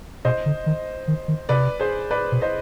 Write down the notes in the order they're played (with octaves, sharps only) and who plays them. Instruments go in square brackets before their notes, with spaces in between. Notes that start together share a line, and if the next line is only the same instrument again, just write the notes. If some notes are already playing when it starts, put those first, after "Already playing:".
[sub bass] B2 [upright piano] C5 D#5
[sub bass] D3
D#3
D#3
D#3
[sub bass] C3 [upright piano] B4 D5
[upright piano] G#4 C5
B4 D5
[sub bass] B2
[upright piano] C5 D#5